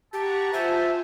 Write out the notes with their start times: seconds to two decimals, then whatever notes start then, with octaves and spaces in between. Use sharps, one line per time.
0.13 G4 F#5 A5 A#5 C#6
0.53 F4 C5 E5 G#5